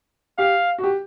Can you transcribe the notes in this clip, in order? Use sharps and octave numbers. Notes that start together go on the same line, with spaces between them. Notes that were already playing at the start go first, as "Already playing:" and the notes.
G4 F5
F#4
G4